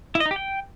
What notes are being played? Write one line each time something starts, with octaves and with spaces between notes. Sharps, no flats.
E4
D#5
D#4
G4
G5